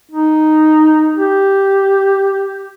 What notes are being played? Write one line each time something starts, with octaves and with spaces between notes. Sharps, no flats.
D#4
G4